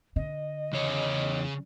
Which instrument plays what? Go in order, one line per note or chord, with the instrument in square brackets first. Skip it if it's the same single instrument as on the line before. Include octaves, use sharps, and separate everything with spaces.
[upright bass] D3 [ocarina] D#5
[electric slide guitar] E2 C#5 [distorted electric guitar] C#3